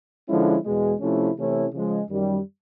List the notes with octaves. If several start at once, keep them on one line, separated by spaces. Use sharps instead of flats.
D3 F3 G#3 C#4 E4
E2 B2 G#3
C3 F3 A3 C#4 E4
C3 E3 A3 C#4 E4
C#3 F3 G#3
F#2 D#3 G3